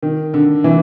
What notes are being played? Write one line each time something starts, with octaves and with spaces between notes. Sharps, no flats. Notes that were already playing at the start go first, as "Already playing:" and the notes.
D#3
D3
E3